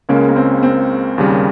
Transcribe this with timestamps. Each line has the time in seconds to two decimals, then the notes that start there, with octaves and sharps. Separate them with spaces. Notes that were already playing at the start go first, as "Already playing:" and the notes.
0.09 C#2 C#3 G#3 A#3 C#4
0.28 A#3
0.36 C4
0.63 C4
1.18 D#2 C#3 G3